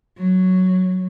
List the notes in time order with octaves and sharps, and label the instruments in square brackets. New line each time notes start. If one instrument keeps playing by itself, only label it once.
[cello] F#3